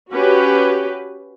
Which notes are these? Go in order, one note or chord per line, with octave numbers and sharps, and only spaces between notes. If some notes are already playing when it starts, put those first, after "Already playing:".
C#4 F#4 G4 B4